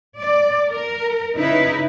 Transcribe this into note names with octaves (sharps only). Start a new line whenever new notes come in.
D5
A#4
C#3 D#4 E4 B4